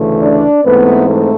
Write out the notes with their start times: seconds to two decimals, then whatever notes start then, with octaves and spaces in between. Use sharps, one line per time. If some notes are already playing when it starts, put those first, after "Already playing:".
Already playing: D2 C#3 E3 A3
0.19 D4 D5
0.64 G#2 E3 A3 B3 C4 B4
1.07 A3 A4